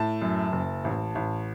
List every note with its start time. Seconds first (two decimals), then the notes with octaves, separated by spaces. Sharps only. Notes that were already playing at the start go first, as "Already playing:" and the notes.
Already playing: A2 A5
0.22 F#2
0.52 F#1
0.85 A1
1.15 A1